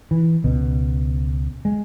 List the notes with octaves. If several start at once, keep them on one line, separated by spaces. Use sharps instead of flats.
E3
C#2 B2
G#3